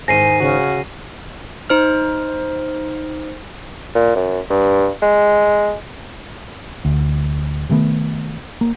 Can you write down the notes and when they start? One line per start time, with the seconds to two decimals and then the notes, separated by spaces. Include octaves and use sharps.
0.08 G#2 D#3 D#4 G#5 A#6 C7 D#7
0.40 C#3 F#4
1.70 D#4 C5 F6
3.95 A#2
4.15 F#2
4.50 G2
5.02 G#3
6.85 D2
7.69 C3 D#3 A3 B3
8.61 A#3